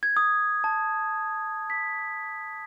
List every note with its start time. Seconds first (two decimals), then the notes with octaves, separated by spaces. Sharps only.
0.03 G#6
0.17 D#6
0.64 A5
1.70 B6